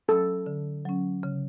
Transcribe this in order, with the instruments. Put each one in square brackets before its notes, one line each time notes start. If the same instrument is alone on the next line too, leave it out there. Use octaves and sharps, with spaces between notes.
[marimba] F#3 C#4 [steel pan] A4
[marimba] D3
F#3 C#4
C#3